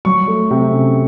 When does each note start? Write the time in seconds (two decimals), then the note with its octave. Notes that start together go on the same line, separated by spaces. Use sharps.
0.05 F#3 C#6
0.28 A3
0.51 C3
0.73 C#4